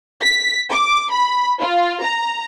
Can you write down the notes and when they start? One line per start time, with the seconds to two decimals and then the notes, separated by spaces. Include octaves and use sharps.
0.21 B6
0.70 D6
1.11 B5
1.60 F4
2.02 A#5